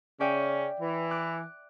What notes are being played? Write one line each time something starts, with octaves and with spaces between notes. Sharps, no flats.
C#3 C#4 D5 E5 G5
E3
D6 F#6 D7